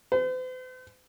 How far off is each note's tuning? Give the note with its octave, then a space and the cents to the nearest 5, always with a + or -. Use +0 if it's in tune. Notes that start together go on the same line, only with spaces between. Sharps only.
C5 -45